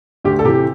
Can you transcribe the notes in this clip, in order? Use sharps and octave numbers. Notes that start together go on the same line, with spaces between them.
D2 G4
A4
C3 E3 G4